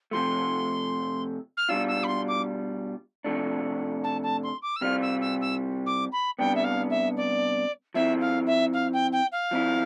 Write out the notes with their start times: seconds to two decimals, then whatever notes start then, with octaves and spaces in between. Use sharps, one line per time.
0.11 C3 F3 A3 C6
1.57 F6
1.69 B2 G3 D4 F4 E6
1.88 E6
2.03 B5
2.07 C6
2.28 D6
3.24 C3 F3 A3 D4
4.03 A5
4.23 A5
4.43 C6
4.62 D6
4.76 E6
4.81 C3 G3 C4 F4 F6
5.02 E6
5.21 E6
5.41 E6
5.86 D6
6.12 B5
6.38 C3 G3 B3 D4 G5
6.55 E5
6.64 F5
6.90 E5
7.17 D5
7.94 F3 C4 E4 E5
8.20 F5
8.46 E5
8.73 F5
8.93 G5
9.12 G5
9.32 F5
9.51 F3 C4 E4